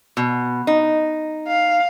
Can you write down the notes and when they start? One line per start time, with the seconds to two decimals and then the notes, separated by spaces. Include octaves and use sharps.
0.17 B2
0.67 D#4
1.48 F5